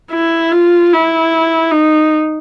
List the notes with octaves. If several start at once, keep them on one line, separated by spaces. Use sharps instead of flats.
E4
F4
E4
D#4